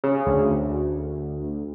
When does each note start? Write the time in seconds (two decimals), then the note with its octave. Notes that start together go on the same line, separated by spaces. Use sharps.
0.04 C#3
0.26 D2